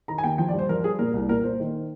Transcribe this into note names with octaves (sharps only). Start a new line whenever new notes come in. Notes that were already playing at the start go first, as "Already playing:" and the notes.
D#3 A#5
G#5
D#2 G5
F3 G5
D5
G2
C5
F3 A#4
G2 G#4
A#2 A#4
C2
A#2 A#4
A#2 C5
D#3